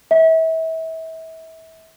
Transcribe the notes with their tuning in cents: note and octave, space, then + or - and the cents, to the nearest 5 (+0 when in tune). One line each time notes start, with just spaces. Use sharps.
E5 -35